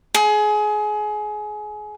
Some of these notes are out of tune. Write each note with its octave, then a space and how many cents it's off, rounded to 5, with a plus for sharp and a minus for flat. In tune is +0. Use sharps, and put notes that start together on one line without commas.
G#4 +25